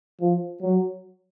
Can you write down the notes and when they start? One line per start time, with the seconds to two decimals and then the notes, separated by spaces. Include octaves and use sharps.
0.21 F3
0.62 F#3